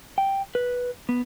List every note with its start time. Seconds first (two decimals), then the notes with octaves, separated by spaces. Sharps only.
0.18 G5
0.55 B4
1.09 B3